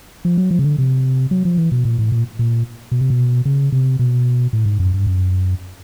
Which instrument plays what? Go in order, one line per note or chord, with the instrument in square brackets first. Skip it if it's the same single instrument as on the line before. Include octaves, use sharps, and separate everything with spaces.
[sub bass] F3
F#3
F3
C#3
D3
C3
F#3
F3
E3
B2
A#2
A2
A#2
A#2
B2
C3
B2
C#3
C3
B2
A2
G#2
F#2
G2
F#2